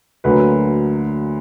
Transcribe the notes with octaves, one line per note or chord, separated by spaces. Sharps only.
D2 D3 F#3 A#3 B4